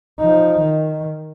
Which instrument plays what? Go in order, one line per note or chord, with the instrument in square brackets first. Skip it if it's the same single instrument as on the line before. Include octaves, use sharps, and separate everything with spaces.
[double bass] F3 D#4
D#3